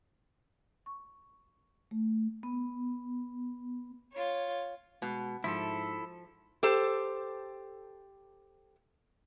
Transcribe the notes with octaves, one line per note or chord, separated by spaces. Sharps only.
C#6
A3
B3
F4 C#5
B2 G#3
G#2 F3 E4 A4
G4 A4 C5